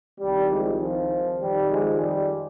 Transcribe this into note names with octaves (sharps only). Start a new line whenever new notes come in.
C2 C3 D#3 G3
F3 G#3
F3
F2 D#3 G3
F3 G#3
G3